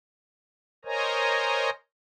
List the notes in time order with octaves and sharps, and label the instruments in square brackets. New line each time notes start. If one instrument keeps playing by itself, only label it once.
[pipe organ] A#4 C5 C#5 D#5 G#5 A#5